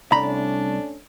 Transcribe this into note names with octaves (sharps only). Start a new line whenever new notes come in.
C2 A3 C#4 D4 A#5 B5